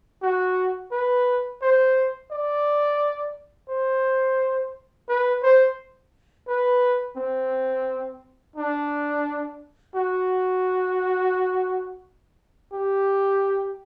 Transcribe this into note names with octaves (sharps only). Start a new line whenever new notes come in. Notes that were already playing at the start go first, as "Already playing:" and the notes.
F#4
B4
C5
D5
C5
B4
C5
B4
C4
D4
F#4
G4